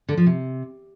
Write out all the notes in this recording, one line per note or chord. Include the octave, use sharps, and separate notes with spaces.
D3
F3
C3